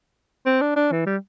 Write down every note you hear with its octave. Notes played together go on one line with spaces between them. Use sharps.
C4
D4
D4
E3
G3